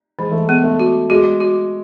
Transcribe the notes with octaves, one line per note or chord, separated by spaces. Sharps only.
E3 G#3
A3
G#3 B3
A3
F#4
G#3 F#4
F#4